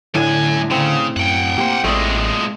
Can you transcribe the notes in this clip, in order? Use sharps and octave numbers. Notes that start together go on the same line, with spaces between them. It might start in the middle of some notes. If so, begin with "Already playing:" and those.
F#2 A2 D3 D4 G#5
C#3 C4
F#2 F#5 G5
A#3 G4 C5
A1 A#2 G#3 A3 D5